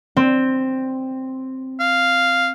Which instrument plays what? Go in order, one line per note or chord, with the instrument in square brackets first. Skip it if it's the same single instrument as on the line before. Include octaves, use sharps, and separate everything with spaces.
[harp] C4
[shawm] F5